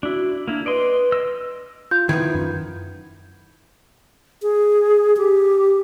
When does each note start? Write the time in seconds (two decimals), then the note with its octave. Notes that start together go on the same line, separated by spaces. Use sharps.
0.03 D4 E4 F#4
0.48 A#3 D4 E4
0.66 B4 D5 D#5 C6
1.12 D#5 E6
1.91 F4 G6
2.09 D#3 F3 B3 E4 G#6
2.35 F#2
4.42 G#4
5.17 G4